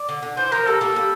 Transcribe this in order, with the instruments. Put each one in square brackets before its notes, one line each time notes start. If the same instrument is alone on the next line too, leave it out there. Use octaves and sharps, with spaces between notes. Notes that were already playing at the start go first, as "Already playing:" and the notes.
Already playing: [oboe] D5
[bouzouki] D3
D3
[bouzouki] E3 [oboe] C5
[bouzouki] F3 [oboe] A#4
[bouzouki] G3 [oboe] A4
[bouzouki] G3 A#3
G3